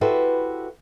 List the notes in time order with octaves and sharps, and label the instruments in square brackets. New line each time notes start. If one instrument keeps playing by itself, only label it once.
[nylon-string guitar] E4 F#4 G4 A4 B4 C5